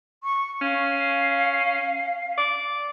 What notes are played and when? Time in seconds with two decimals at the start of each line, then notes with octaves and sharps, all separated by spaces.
0.24 C#6
0.61 C#4 F5
2.38 D5